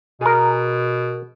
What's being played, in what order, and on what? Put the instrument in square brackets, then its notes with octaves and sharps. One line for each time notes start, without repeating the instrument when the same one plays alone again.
[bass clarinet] B2 [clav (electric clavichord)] G#4 A#4